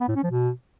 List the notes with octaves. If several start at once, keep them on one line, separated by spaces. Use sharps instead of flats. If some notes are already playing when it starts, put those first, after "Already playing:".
B3
A2
C#4
F3
B2